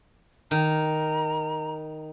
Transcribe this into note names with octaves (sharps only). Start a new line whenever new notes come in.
D#3 A#5